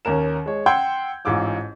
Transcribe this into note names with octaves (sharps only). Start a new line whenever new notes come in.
D#2 C#4 A#4 E7
G#3 C#5
F#5 G5 C6 E6 G6 G#6
A1 G#2 F4 D6 E6